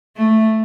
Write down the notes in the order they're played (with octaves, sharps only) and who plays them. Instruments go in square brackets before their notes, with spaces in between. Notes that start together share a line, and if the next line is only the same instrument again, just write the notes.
[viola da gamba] A3